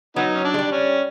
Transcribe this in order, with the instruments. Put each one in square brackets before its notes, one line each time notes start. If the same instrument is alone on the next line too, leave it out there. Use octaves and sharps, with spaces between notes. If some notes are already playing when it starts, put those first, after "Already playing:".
[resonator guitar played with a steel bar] F#3 [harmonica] B3 D#4
[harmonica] C#4
D4
[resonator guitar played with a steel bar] G#3
G3
[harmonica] C#4